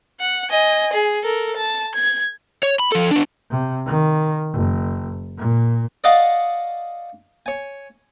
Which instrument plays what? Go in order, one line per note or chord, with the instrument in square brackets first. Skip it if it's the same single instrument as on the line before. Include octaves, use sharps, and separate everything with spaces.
[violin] F#5
D#5 G#5
G#4
A4 A#4
A5
G#6
[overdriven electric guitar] C#5
B5
F3 A4
B3 D4
[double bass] C3
D#3
F#1
A#2
[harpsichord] D5 D#5 F5 F#5 A5 C#6
C#5 G#5